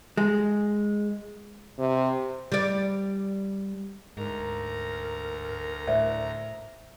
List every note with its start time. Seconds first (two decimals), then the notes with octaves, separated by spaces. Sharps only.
0.17 G#3
1.79 C3
2.52 G3 D5
4.17 D2 G#2 A#4 A#5
5.88 A2 C5 D5 E5